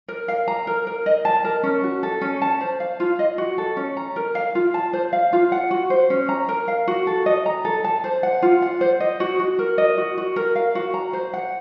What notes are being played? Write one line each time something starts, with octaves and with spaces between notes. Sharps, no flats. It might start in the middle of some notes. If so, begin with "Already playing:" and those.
A#4
F5
A#5
A#4
A#4
D#5
A5
A#4
C#4
F#4
A4
C#4
A5
C5
F5
F4
D#5
F#4
A4
C#4
A#5
A#4
F5
F4
A5
C5
F5
F4
F#5
F#4
C5
C#4
A#5
A#4
F5
F#4
A4
D#5
A#5
A4
A5
C5
F#5
F4
F#5
C5
D#5
F#4
F#4
A#4
D#5
F#4
F#4
A#4
F5
F#4
A#5
C5
F#5